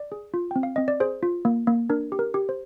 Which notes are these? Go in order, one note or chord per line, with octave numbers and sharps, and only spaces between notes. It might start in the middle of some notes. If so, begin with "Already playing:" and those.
Already playing: D5
G#4
F4
C4 G5
F5
C4 D#5
D5
G#4 C5
F4
A#3
A#3
D4 A#4
G4
A#4
G4
C5